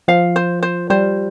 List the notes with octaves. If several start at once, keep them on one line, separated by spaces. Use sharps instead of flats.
F3 F5
C5
C5
G3 C5